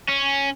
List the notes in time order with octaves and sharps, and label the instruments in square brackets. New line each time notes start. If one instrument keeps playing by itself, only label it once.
[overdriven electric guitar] C#4